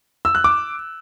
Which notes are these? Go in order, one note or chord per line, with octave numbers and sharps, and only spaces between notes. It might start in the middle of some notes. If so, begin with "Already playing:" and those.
E6
F#6
D6